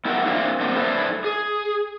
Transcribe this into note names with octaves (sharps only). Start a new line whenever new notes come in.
B3 E4 G4 A#4 F5 F#5
A#3 C4 D4 E4 F4
A3 A#3 C4 D4 F#4
E4 A4 B4 C5 D5 E5
G#4